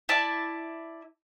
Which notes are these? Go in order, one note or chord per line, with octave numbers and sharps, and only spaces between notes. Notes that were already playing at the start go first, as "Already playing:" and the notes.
E4 D5 A5